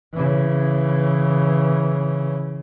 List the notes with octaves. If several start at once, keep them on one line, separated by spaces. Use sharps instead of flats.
C#3 E3